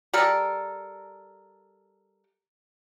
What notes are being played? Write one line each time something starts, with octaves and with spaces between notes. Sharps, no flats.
G3 A4 A#4